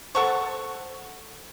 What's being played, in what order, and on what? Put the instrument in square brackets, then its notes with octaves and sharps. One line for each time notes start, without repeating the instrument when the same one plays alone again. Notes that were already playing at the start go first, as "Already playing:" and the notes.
[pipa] A4 A5 C#6 [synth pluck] C5 F#5